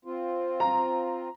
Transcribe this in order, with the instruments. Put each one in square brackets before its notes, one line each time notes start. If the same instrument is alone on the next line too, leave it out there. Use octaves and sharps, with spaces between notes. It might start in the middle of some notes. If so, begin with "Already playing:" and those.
[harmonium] C4 F4
[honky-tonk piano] A#5